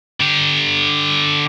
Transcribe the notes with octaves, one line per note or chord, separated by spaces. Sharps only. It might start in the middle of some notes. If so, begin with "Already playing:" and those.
D3 G4